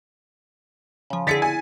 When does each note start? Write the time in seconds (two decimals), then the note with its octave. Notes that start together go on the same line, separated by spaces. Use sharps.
1.10 C#3 F3
1.27 D3 E4 G#4 A6 B6 C#7
1.42 G#5